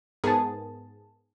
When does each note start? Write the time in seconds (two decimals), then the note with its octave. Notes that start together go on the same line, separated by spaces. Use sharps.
0.24 G#2 B3 G#4 A#4 A5